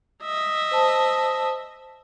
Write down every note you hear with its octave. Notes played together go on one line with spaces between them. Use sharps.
D#5 E5
C5 A5